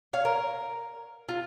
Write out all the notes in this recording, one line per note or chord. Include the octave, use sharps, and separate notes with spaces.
C#5 F5
A#4
F4